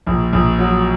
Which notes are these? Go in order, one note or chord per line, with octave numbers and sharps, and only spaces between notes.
A#1
A#1
F#3